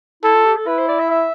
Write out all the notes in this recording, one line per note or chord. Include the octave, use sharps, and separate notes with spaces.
E4 A4
F4
G4
A4
E4 B4
C5
D5
E5
E5